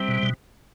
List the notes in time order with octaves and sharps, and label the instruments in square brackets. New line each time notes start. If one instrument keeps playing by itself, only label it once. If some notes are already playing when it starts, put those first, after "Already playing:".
Already playing: [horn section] C3 C4 [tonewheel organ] G3
[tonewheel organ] B2
B2